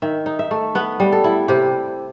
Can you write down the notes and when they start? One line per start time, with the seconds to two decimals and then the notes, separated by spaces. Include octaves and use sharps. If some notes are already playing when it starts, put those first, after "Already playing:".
0.02 D#3 E5
0.26 D#4
0.39 E5
0.51 A3
0.75 B3 B4
1.00 G3
1.12 A4
1.24 E4
1.48 C3 G4